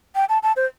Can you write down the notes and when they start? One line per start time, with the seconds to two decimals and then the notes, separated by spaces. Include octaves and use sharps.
0.15 G5
0.29 A5
0.43 A5
0.56 C5